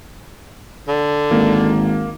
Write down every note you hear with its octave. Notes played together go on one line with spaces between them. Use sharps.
D3
G#1 A#3